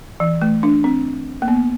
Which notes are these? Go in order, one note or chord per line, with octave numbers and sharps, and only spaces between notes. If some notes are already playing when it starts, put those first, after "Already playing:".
E3
A3
D4
C4
A#3
B3